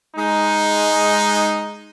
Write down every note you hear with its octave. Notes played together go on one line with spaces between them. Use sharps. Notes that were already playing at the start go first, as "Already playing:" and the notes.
G#3 D#4